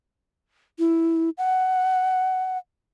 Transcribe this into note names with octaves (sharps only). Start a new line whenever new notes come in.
E4
F#5